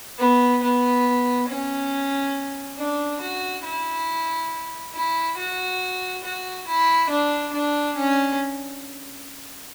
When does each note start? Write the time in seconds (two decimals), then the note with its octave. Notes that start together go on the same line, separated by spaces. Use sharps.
0.19 B3
0.63 B3
1.48 C#4
2.78 D4
3.21 F#4
3.64 E4
4.94 E4
5.37 F#4
6.23 F#4
6.67 E4
7.10 D4
7.53 D4
7.96 C#4